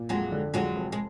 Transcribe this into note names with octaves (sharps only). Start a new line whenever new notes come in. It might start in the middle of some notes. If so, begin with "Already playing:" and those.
Already playing: A#2
F2 F#3 G#3
D3
F2 F#3 G#3
F1
G#3